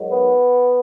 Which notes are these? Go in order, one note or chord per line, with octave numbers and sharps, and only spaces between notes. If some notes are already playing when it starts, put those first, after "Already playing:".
Already playing: G#2 D#3 F#3
B3